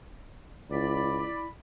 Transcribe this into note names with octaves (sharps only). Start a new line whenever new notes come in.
C#2 E4 D5 B5